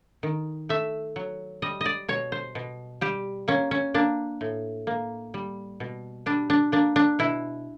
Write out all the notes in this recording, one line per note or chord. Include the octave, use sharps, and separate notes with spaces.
D#3
A3 E5
F#3
G3 D#5
D5 D#5
B2 C#5
C5
B2
G3 G4
A#3 C#4
C#4
A#3 D4
A2
A#3
G3
B2
G3 D4
D4
A#3 D4
D4
B2 E4